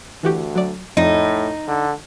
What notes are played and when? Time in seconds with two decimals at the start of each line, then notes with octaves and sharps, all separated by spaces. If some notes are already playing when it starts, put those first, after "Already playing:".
0.23 D2 E3 F#4 G4
0.55 F#3 D5
0.97 F2 A2 D#4
1.67 D3